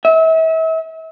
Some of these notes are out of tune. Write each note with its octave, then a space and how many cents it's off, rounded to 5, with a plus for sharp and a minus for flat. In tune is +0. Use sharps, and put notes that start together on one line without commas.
E5 -35